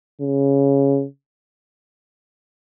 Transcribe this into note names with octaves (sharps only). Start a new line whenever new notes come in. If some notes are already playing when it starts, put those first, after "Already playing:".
C#3